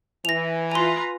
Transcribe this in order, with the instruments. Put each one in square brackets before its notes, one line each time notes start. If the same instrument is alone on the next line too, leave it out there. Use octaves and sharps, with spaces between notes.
[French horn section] E3 [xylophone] A#6 F7
[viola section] F4 B4 A#5 [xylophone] G#5 C6